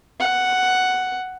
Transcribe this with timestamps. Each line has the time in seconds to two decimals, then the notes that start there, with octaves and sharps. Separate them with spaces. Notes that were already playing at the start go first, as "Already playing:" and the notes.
0.20 F#5